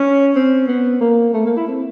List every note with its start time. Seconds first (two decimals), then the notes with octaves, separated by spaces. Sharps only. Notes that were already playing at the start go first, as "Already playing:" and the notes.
Already playing: C#4
0.36 C4
0.68 B3
1.01 A#3
1.34 A3
1.46 A#3
1.57 E4
1.68 C4